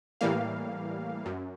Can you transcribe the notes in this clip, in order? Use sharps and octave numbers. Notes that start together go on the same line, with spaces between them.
A2 E3 G3 A#3 F5
F#2